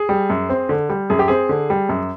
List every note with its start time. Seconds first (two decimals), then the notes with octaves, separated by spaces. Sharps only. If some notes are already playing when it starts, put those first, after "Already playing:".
Already playing: G#4
0.09 G3
0.30 F#2
0.49 C4
0.69 D3
0.89 G3
1.10 F#2 G#4
1.19 G4
1.28 C4 G#4
1.49 D3
1.70 G3
1.89 F#2